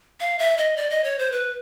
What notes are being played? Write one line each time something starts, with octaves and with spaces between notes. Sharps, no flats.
F5
E5
D#5
D5
D#5
C#5
C5
B4